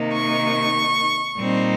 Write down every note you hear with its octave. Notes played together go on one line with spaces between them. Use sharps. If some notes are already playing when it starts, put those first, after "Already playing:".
Already playing: C3 D#3 A#3 D#4
C#6
A#2 G3 C4 D#4